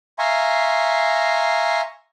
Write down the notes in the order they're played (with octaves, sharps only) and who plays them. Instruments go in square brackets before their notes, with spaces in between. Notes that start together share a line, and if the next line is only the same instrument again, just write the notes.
[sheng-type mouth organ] E5 F5 G#5 A#5 C6 C#6